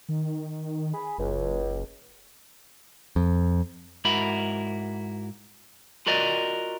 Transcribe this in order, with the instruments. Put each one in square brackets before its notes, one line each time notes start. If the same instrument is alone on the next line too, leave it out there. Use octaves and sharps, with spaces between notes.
[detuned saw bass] D#3
[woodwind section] G#4 B5
[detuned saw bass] F#1 [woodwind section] C#2
[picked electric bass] F2
[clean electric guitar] G#2 E4 F#4 A#4 B5
F4 F#4 A#4 D5 D#5